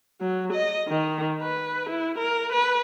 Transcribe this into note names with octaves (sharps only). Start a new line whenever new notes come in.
F#3
D#5
D#3
B4
E4
A#4
B4